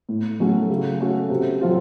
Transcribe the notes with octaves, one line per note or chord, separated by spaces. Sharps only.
A2
F#3 A3 C#4 F#4
C#3
A3 C#4 F#4
C3
F#3 C4 F4 A4